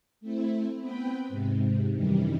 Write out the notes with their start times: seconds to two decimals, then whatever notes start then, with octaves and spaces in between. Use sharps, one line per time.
0.21 A3 C4 E4
0.79 B3 C4 B4 G5
1.28 G#2 C3
1.93 F#2 C3 D#3 E3 G3